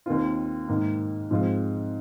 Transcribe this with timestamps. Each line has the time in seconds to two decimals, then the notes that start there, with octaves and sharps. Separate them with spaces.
0.06 D#2 D#3 C4 F4
0.68 G#2 D#3 A#3
1.31 G#2 F3 G#3 C4 F4